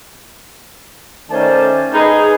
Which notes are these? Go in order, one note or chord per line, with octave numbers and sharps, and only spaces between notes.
D#3 A3 C#4 C5 D5 A5
D#4 G#4 B4